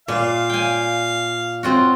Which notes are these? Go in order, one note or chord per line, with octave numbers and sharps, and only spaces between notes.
A#2 F5
G5 G#5
C4 F4 F#4